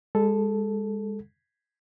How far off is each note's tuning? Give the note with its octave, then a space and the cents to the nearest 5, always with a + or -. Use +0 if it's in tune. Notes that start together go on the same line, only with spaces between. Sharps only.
G#3 -35 A4 -5